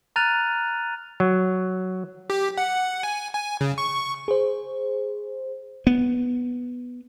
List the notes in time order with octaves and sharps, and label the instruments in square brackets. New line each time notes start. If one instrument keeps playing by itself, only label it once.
[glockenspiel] A#5 F6 F#6 A6 D#7 F7
[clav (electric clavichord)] F#3
[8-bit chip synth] G4
F#5
G#5
G#5
C#3
C#6
[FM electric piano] G#4 C5
[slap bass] B3